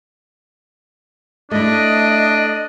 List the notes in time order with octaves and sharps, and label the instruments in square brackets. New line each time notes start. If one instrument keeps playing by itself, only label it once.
[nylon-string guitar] A3 E4 [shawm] D4 [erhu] D#5